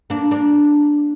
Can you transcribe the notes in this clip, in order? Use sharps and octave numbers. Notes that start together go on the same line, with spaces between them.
A#3 D4
A#3 D4